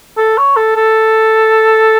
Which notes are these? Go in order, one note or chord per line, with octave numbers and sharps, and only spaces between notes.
A4
C#5
A4
A4